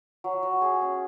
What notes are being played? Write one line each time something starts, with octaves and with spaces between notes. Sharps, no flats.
F#3
F#3
G#4
C#4